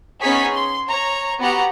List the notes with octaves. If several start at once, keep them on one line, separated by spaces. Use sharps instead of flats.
B3 C#4 D#4 G#4 C#5 B6
C6
C#5 A#5
B3 F#4 G4 F#5 A#5